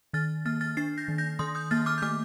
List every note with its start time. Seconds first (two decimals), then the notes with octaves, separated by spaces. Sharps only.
0.13 D#3 F6 A6
0.45 A#3 F6 A6
0.61 F6 A6
0.77 D4 A6 C7
0.98 G6 A#6
1.08 D#3
1.18 G6 A#6
1.39 D#3 C6 D#6
1.55 D#6 G6
1.71 A#3 F6 A6
1.86 D6 F6
1.98 G6
2.02 A3 D6 F6